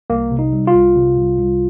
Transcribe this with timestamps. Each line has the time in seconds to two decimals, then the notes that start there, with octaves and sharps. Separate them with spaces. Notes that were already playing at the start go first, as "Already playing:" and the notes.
0.10 C2 A#3
0.31 C3
0.39 D#4
0.53 G3
0.67 F4
0.74 C2
0.96 C3
1.18 C2
1.39 C2